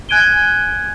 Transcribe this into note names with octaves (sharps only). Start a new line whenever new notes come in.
G#5 F#6 G#6 D7 D#7 G7